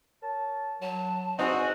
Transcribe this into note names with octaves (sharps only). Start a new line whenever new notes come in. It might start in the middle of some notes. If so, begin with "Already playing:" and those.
A#4 C#5 A5
F#3 A5
E2 G#2 C4 D#4 F#4 F#5 G#5